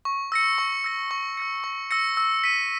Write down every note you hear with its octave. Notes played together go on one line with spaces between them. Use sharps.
C#6
E6 A#6 C#7
C#6
E6 A#6 C#7
C#6
E6 A#6 C#7
C#6
E6 A#6 C#7
E6
B6 D#7